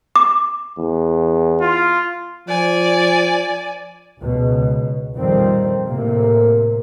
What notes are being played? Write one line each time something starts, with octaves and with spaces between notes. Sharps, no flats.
D6
E2
F4
F3 D5 G#5
C#2 B2
F2 A#2 D#3 F3 G3 C4
A2 C3 A#3